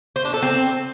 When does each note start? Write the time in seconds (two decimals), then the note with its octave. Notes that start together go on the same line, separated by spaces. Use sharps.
0.16 C5
0.25 D4
0.34 A4
0.42 C4